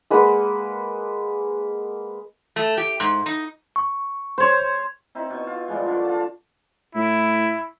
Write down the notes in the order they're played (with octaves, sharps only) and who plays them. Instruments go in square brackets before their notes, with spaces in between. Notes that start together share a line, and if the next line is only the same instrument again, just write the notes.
[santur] G#3 A#3 B4 F#5
[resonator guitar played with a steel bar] A3
G4
G#2
D#4
[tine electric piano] C#6
[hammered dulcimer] C5 C#5
C4 D#4 E4
B2 C#6
F4
A#2 F3 G3 G#3
D3 F4 C#6 D6
F4 A5
[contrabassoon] A2 [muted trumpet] E4